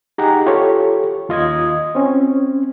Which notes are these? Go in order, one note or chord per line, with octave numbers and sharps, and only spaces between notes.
D#4 G4 G#4 F#5 A#5
F4 G4 A4 C#5
D#2 F4 D#5 D#6 G#6
C4 C#4